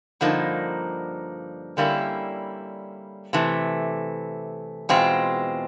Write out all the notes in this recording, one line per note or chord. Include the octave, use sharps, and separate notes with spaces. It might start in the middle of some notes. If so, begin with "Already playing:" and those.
G2 D3 F3 A#3 D#4
D3 G3 A#3 C#4 E4
C3 E3 A3
E2 B2 G#3 C4 F4